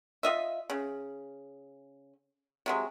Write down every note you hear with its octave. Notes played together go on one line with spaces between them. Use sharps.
F4 D#5 E5
C#3
C3 F#3 G#3